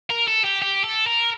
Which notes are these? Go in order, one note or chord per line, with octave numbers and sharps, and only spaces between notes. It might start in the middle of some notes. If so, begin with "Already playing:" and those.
A#4
A4
G4
G4
A4
A#4